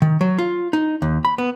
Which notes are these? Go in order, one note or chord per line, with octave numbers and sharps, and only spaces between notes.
D#3
F#3
F4
D#4
D#2
B5
B3